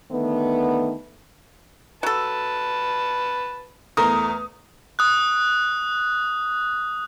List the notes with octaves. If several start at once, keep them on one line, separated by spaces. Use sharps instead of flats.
D3 D#3 A3 B3
F#3 A4 B4 A5
E2 A3 A#4 D#6
D#6 F#6